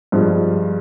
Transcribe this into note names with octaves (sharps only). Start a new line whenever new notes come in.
G2 F3 G#3